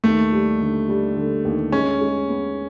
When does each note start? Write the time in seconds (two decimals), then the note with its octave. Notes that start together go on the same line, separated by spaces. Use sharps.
0.04 D#2 A3
0.32 G3
0.60 D3
0.89 G3
1.16 D3
1.45 D#2
1.72 G#3 C#4
2.01 G#3
2.29 B3